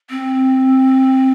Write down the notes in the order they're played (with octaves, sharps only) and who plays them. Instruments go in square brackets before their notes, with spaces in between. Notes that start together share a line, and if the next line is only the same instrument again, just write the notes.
[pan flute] C4